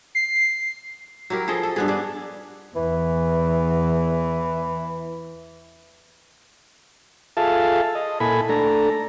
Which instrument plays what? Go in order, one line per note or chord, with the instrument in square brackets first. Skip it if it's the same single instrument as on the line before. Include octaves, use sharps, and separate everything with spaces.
[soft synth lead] C7
[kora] F#3 E4 G4 A#4
F3 G#4 A4 D#5
A4
G2 B3 G#4
D4 G#4
[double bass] E2 [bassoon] E3
[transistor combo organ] F4 G#4 A4 E5 F5 A5
D#5
A#2 E4 A4 G#5 B5
A3 D4 A4 A#5